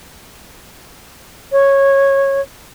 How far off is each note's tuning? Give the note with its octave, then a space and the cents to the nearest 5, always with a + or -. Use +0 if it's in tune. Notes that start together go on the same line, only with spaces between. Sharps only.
C#5 -15